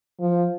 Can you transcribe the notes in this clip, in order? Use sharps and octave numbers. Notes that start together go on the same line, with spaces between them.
F3